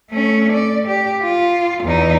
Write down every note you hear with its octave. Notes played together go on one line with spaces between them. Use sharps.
A3 C#4
D5
G4
F4
E2 D#4